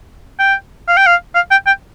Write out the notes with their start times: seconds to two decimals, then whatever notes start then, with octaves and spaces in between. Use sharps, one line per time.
0.39 G5
0.88 F5
0.97 G5
1.06 F5
1.35 F5
1.51 G5
1.67 G5